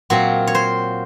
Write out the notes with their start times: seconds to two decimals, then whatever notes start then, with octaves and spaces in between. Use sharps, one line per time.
0.10 A#2 F#3 C4 F4 F#4
0.47 C#5
0.55 C5